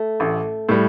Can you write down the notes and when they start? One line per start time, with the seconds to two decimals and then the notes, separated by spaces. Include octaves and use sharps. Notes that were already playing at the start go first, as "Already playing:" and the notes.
Already playing: A3
0.20 A1
0.69 A2 G3